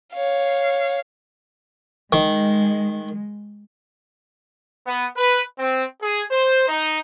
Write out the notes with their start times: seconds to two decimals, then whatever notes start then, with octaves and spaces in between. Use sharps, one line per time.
0.14 C#5 F5
2.13 D#3 G#3
4.86 B3
5.16 B4
5.59 C4
6.02 G#4
6.32 C5
6.68 D#4